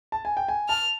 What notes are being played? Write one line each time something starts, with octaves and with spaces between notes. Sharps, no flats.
A5
G#5
G5
G#5
A5 F6